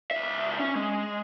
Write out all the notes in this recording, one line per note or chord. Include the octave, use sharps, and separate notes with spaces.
C#2 E5
C#4
G#3